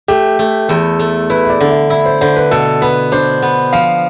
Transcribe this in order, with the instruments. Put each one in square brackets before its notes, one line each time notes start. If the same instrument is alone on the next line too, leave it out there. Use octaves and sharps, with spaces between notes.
[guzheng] A3 [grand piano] G4
[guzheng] A3
[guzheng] E2 [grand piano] A4
[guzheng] A3
[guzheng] E4 [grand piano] B4
[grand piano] E5
D5
[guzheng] D3
[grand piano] E5
[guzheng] E4 [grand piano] E5
[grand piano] C5
[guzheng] D3 [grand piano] C5
[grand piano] B4
[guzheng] B2 [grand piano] A4
[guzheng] B3 [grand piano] B4
[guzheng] D4 [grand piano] C5
[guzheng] B3
[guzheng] F3 [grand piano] F5